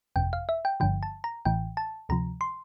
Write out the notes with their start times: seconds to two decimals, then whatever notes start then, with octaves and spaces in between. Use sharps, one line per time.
0.16 G1 F2 C3 G5
0.33 F5
0.49 E5
0.65 G5
0.80 G1 G2 D3 F3 G5
1.03 A5
1.24 A#5
1.45 A1 A2 E3 G5
1.77 A5
2.09 D2 C3 F3 A#5
2.41 C6